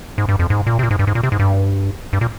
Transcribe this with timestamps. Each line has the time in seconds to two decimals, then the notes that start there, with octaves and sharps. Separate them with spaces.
0.18 G#2
0.29 G2
0.39 F2
0.50 G#2
0.67 A#2
0.79 C3
0.83 A#2
0.91 G#2
0.99 G2
1.07 G#2
1.15 A#2
1.24 C3
1.32 G#2
1.39 G2
2.13 G2
2.21 A#2